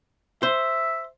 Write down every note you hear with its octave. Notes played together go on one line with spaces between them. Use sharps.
C5 E5